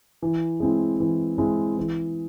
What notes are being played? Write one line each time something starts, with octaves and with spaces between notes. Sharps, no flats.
E3
G#3 C4 E4
E3
G#3 C4 E4
E3